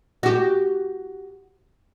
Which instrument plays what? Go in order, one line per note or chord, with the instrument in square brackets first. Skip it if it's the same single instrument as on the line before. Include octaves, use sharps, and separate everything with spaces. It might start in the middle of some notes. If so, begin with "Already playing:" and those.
[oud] F#4 G4